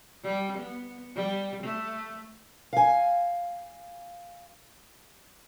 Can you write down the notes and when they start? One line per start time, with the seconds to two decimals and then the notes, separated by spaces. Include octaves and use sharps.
0.24 G3
0.59 B3
1.16 G3
1.64 A3
2.73 F5 G#5